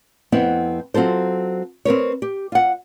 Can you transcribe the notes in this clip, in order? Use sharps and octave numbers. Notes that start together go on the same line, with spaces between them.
F2 B3 C4 E4 F#5
F#3 C4 F4 A4 C5
C4 A#4 B4 C#5
G4
F4 F#5